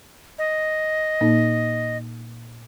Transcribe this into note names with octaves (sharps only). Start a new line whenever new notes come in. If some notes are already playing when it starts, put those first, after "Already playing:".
D#5
A#2 A#3 D#4